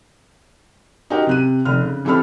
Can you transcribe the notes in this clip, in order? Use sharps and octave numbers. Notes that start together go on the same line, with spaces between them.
D#4 F#4 G4 A#4 G5
C3 F#6 D#7
F1 F6
C#3
E3 C4 G4 A4 B5 F6